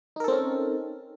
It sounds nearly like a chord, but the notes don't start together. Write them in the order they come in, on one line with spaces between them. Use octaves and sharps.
D#4 A#4 A4 C4 C#4